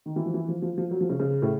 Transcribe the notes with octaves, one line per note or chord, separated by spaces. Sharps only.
D#3
E3
F3
E3
F3
F3
F3
F#3
F3
C#3
C#3
A2